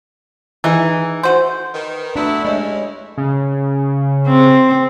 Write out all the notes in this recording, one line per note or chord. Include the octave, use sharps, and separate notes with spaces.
E3 D#4 G#4
A3 F#4 C5
D#3 B4
A3 B3 D4 E4 F#4 A#5
G2 G#3 C#4 E4 C#5 D#5
C#3
C4